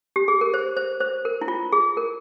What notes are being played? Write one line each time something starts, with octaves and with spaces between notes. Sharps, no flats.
G4
G#4
A#4
C5
C5
C5
A#4
E4
F4
G#4
A#4